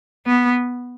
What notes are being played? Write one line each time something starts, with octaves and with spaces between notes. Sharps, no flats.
B3